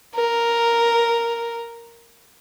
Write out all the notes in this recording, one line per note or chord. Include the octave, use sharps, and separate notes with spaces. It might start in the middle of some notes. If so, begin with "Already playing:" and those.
A#4